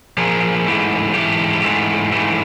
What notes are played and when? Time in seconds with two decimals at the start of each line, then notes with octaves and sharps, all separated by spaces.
0.18 A#2 F3 A#3 G#4
0.67 G#2 E3 A3
1.14 G#2 E3 A3 G4
1.64 G#2 E3 A3
2.12 G#2 E3 A3